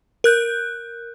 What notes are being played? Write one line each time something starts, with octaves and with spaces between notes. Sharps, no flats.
A#4 F#6 G6